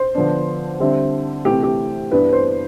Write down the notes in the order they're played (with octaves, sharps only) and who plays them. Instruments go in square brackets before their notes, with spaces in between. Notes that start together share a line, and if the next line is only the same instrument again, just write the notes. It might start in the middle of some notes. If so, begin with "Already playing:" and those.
Already playing: [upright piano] C5
D3 F3 B3 D4
D3 G3 C4 E4
C3 E3 A3 G4
G4
G2 E3 B3 D4 B4
C5